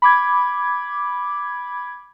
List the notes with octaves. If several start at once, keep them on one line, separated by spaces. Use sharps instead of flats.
B5 D6 G#6